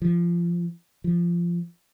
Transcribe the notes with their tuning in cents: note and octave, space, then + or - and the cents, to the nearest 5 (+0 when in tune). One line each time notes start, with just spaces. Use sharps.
F3 -20
F3 -15